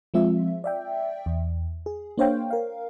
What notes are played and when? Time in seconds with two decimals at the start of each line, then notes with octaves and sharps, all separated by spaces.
0.14 F3 G#3 C4 F4 E5
0.64 D5 E5 G5
1.26 E2
1.86 G#4
2.18 A#3 D4 C5 C#5 F5 G5
2.50 A#4 F5